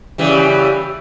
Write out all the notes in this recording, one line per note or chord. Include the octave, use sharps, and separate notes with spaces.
C#3 E3 G3